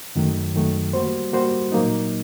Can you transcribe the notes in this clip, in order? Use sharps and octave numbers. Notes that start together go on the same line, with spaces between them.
F#2 D#3 F#3 A3
F#2 D#3 F#3 A3
G3 A#3 F#4 C5
G3 A#3 F#4 C5
A#2 F#3 A#3 D#4